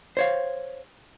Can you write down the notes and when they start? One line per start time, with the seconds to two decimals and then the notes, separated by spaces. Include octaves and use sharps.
0.17 C5 C#5 F5